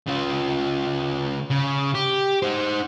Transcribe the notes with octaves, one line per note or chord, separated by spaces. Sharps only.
C#3 F4
C#3
G4
D#4 C5